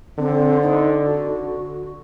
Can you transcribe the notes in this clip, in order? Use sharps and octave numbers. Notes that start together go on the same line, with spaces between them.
D3 C4
D#4
F#4